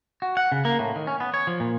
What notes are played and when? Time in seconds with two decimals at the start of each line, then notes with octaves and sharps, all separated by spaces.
0.22 F#4
0.37 F#5
0.52 C#3
0.65 A#3
0.79 A2
0.96 D#3
1.07 C#4
1.20 B3
1.34 C#5
1.47 F3
1.60 A#2